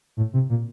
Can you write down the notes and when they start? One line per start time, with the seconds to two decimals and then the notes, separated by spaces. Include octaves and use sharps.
0.17 A2
0.33 C3
0.49 A#2